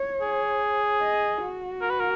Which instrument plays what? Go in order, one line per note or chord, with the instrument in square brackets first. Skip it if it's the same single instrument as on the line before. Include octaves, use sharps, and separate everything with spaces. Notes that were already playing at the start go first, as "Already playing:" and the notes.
Already playing: [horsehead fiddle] C#5
[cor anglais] G#4
[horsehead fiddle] D#5
F#4
[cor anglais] A#4
B4
A#4